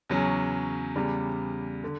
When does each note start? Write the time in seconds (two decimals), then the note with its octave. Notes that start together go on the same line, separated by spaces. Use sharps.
0.09 E2 C#3 F#3 C#4
0.96 E2 C#3 G3
1.84 D3